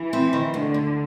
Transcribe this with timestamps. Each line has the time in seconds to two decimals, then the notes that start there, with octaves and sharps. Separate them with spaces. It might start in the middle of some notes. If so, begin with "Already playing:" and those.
Already playing: E3
0.13 C4
0.33 D#3
0.54 D2 D3
0.74 D2